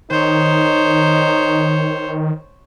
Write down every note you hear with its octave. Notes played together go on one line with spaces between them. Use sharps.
D#3 D#4 C5 C#5